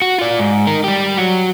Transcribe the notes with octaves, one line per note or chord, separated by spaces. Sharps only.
F#4
F4 D5
G#2
D#4 A#4
G3 G4
F#3 F#4